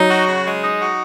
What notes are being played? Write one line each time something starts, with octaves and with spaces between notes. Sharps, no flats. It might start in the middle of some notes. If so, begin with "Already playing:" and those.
Already playing: F#3 D#4
F#4
C#3
G#3
D#4
F#4